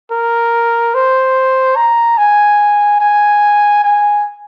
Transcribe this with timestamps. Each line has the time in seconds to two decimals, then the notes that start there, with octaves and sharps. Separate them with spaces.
0.12 A#4
0.95 C5
1.76 A#5
2.18 G#5
3.01 G#5
3.84 G#5